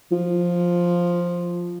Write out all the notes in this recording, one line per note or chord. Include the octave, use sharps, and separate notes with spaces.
F3